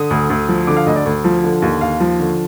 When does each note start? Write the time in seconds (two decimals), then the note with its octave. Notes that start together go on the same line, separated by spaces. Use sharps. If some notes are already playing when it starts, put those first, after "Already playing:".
Already playing: D3 D#6
0.11 D2
0.30 D2
0.49 F3
0.67 D3 D6
0.77 F5
0.86 D2 D#5
0.96 D5
1.06 D2
1.24 F3
1.44 D3
1.62 D#2
1.81 D#2 F5
2.00 F3
2.20 D3